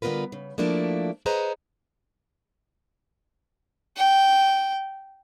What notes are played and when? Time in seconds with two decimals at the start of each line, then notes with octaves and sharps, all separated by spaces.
0.02 D3 G3 B3 F4 A#4 B4
0.32 C#3
0.58 F3 A3 A#3 D4 E4
1.26 G#4 B4 C5 D#5 F#5 A#5
3.97 G5